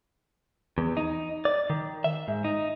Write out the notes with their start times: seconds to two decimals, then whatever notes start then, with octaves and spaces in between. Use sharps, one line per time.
0.78 E2
0.97 D#4
1.45 D5
1.70 D#3
2.04 E5
2.28 G#2
2.44 D#4